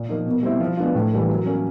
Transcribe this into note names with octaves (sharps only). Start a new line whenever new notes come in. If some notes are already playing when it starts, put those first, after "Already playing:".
Already playing: A#2
F3 A#3 D#4
B2
G3 C4 E4
F3
G#3 B3 D4 F4
A2
E3 G3 A#3
F#3
A#3 C#4